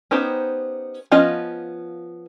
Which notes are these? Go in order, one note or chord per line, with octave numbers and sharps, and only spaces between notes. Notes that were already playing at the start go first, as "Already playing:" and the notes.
B3 C#4 D#4 G4 C5
F3 B3 C#4 F4 D#5